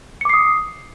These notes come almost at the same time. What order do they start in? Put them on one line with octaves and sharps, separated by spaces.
C#7 D6 C7 D#6